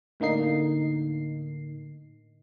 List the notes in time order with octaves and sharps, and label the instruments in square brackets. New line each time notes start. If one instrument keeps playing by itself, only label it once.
[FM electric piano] A2 D3 A#3 D#4 C7